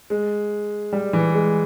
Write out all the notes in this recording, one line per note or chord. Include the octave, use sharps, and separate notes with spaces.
G#3
G3
E3
G#3